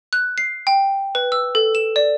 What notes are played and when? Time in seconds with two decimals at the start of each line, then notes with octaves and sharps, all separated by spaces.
0.13 F#6
0.38 C7
0.67 G5
1.15 B4
1.32 E6
1.55 A4
1.75 E7
1.96 D5